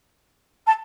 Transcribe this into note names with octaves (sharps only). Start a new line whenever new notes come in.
A5